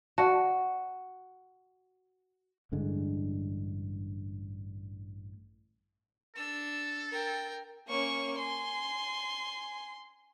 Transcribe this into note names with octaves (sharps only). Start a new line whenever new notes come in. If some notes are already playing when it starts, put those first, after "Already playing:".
F#4 D5 A5
A1 G2 D3 G#3
D4 A4 E6
A#4 G5
A#3 C#4 C#5 C#6
G#5 C6